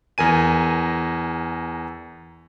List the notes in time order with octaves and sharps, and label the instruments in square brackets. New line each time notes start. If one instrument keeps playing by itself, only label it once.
[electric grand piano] E2 A#4 G#5 D#7